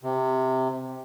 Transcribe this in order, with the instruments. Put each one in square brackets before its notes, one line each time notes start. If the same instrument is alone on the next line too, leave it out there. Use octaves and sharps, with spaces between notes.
[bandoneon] C3